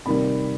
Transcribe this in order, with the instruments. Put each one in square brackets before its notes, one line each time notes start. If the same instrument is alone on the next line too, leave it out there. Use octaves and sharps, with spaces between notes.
[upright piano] C3 D#3 G3 B5